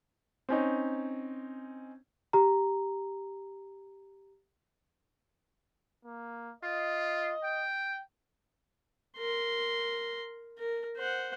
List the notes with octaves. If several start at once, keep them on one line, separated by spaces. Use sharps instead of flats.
C4 C#4 D#4
G4 A#5
A#3
F4 D#5
G5
A#4 C6
A#4
C5 F#5